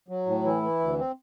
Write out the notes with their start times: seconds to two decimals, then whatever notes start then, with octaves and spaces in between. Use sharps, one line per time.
0.08 F#3
0.26 A2
0.44 E3 E4
0.62 E3
0.80 D2
0.98 C4